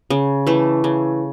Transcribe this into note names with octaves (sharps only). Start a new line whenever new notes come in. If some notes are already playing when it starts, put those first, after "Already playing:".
C#3
E3 A3
C#3